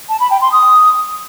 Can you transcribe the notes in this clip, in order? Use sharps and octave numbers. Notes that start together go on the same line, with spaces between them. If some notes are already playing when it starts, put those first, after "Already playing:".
A5
B5
G5
C6
D#6